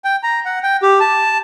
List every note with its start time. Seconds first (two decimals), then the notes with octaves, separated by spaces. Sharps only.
0.04 G5
0.23 A#5
0.45 F#5
0.63 G5
0.83 G4
1.00 A5